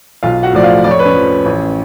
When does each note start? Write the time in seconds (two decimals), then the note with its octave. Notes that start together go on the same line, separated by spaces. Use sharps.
0.23 B1 F4 F5
0.43 F#4 F#5
0.53 A2 F3 D5
0.64 F4 F5
0.84 F2 D5
0.91 C#5
0.99 B4
1.05 C#4 C#5
1.15 F3
1.46 A1